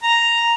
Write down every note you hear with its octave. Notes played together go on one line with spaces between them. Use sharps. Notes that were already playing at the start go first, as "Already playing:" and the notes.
A#5